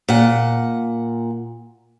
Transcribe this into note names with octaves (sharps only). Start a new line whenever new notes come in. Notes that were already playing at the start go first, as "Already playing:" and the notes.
A#2 F#5